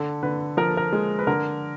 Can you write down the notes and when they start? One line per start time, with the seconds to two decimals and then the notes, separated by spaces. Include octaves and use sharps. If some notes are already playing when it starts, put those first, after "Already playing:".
Already playing: D3 A4
0.23 D3 B4
0.57 F3 A#4
0.68 A4
0.77 A#4
0.92 G#3
1.19 B4
1.27 D3 A#4